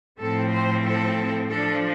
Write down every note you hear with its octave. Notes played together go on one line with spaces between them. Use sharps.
A2 F3 C4 A4
C5
A4
F3 D4 A4